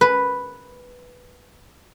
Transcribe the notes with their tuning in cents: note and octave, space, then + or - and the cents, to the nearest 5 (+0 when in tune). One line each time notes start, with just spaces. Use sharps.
B4 +0